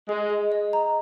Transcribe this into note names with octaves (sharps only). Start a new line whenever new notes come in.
G#3 G#4
G#4
D#5
A#5